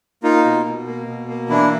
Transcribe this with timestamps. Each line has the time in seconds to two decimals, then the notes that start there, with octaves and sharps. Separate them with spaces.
0.23 A#3 D#4 F4
0.45 B2
0.66 B2
0.86 A#3
1.07 B2
1.28 A#3
1.49 E3 D4 E4